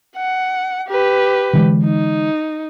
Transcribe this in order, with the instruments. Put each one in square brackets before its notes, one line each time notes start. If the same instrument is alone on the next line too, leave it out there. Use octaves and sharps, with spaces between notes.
[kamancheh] F#5
G4 B4
[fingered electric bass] D3 E3 G#3
[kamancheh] D#4